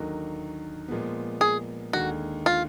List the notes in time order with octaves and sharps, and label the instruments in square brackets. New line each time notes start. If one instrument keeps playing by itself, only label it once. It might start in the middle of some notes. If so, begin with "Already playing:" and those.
Already playing: [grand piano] D#2 D3 F#3 A#3 D#4
A#2 F3 G#3 B3
[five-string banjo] G#4
[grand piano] D#2 D3 G#3 [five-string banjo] F#4
[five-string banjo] F4